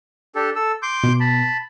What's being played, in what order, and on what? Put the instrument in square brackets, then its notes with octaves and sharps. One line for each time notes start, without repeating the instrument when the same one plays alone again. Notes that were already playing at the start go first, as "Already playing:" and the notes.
[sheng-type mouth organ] D4 G4 A4
A4 E6
C6 D6 G6
[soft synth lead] B2
[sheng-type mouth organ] A5 B5